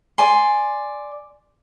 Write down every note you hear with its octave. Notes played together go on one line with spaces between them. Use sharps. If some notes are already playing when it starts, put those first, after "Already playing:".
D5 G#5 C6